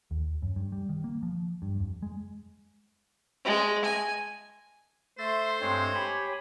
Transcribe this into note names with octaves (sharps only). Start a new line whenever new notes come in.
D#2
F#2
G2
G3
D#3
A#3
F3
G2
F2
G#3
G#3
G#5
A3 C5 E5 C6 A6
G2 G#3 C4 C#5
G4 G#5 B5